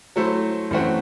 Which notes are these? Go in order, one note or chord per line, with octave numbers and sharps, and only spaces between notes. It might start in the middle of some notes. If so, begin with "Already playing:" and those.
F#3 A3 E4 A4 C5
F#2 E3 A3 C4 F#4